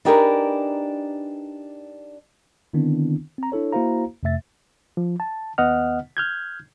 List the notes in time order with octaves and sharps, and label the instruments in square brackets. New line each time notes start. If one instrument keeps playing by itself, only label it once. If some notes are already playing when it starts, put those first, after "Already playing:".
[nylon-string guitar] D4 D#4 G4 G#4 A#4 B4
[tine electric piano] D3 D#3 B3 C4 D4 E4
C4 A#5
D4 E4 A4 C#5
A#3 E4 F#4 C5 F5 A#5
F2 C3 A3 E5 A6
[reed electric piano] F3
A5
D#2 B3 D#5 F#5 F6
F6 G6 G#6